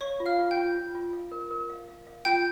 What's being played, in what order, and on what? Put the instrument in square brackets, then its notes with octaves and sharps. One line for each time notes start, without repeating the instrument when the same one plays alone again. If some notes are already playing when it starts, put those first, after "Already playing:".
[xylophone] C#5 C#6 [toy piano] F5
[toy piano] F4
[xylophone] F5 F6
[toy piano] F4
[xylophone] G5 G6
[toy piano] F4
F4
F4
F5
A#4
A#4
F5
F5
F5
[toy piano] F4 [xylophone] G5 G6